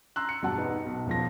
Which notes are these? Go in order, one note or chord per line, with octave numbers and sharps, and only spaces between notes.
A#5 C6 E6 F#6
C#7
E2 G2 B2 F#5 A5
D#4 B4
B1
E1 F3 A#6